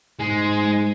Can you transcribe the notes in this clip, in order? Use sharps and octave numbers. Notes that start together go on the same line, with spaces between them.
G#2 G#3